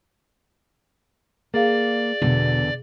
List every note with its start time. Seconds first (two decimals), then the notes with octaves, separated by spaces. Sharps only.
1.54 A#3 G#4 D5 F5
2.22 E2 B2 D3